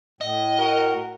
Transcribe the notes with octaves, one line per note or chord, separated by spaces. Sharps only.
A2 D#5
F#4 A#4